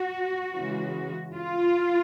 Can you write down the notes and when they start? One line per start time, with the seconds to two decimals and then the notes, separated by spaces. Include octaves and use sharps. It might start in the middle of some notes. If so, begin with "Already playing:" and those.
Already playing: F#4
0.55 C#3 E3 G#3
1.35 F4